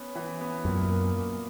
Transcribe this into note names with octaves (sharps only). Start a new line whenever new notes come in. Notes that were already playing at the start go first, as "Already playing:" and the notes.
Already playing: B3 C#4
E3
B3
F#2 A#2
A#3
A#3